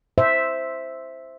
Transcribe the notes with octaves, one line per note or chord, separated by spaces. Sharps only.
C5 E5